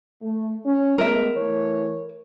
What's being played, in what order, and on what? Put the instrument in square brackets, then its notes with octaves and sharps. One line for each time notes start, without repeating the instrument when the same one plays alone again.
[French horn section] A3
C#4
[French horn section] G#3 A3 B3 [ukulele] A#4 E5
[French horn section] E3 A3 C#5